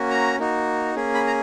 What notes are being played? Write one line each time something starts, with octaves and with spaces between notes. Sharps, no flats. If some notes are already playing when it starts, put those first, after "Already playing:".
Already playing: A#3 C#4 F#4
A#5
A#3 D#4 F#4
A#3 C#4 G#4
B5
A#5